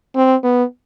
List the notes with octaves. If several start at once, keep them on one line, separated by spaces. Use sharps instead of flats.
C4
B3